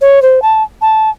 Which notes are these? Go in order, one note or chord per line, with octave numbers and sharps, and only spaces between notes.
C#5
C5
A5
A5